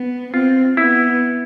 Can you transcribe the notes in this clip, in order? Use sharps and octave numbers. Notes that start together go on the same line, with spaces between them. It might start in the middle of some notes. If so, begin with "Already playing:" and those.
Already playing: B3
C4 F4
B3 E4